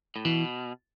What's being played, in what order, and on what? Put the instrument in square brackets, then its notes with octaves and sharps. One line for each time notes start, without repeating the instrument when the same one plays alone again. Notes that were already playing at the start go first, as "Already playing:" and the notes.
[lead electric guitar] A2
[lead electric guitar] B2 [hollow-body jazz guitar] E3